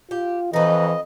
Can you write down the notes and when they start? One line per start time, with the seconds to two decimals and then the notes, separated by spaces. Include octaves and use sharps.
0.11 F4 G4
0.53 F2 E3 D#4 B4 D#5